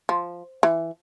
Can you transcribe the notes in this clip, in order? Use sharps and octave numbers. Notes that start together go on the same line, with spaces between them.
F3
E3